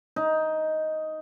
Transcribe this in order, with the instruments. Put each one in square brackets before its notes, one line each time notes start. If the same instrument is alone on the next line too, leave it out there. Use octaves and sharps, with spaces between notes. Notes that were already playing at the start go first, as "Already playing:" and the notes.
[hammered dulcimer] D#4